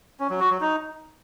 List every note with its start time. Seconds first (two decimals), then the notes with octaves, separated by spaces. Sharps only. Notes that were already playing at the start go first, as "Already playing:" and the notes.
0.20 C#4
0.30 F#3
0.40 F#4
0.51 F#3
0.61 D#4